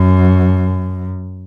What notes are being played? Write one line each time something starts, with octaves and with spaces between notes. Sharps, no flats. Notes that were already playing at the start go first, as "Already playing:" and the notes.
Already playing: F#2